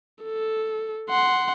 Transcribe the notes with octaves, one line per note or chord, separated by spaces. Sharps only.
A4
F#5 C6